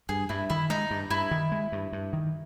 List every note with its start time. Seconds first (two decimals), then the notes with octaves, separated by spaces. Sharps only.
0.09 G2 G#4
0.29 G2 E4
0.50 D#3 E4
0.70 G#3 D#4
0.91 G2
1.10 G2 E4
1.31 D#3
1.52 G#3
1.72 G2
1.93 G2
2.13 D#3